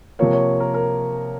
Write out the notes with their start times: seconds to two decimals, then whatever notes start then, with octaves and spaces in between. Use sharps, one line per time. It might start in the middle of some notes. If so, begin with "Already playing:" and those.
0.19 C3 F3 A#3 C#5
0.33 C#5
0.60 A#4
0.74 A#4